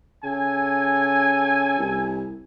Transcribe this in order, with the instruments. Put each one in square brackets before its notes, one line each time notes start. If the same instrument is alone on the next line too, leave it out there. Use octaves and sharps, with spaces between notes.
[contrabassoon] C#3 [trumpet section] A4 G#5
[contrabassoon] C2